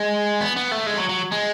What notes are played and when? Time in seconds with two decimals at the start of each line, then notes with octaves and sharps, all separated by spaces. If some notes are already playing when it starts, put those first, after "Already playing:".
Already playing: G#3
0.40 B3
0.56 B3
0.71 A3
0.86 G#3
0.97 F#3
1.09 F#3
1.32 G#3